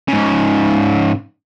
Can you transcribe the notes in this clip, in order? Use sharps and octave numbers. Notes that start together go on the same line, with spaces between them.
G#2 C#3